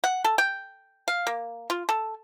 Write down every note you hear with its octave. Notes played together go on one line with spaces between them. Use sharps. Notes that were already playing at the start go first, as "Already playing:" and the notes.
F#5
A4
G5
F5
A#3
F4
A4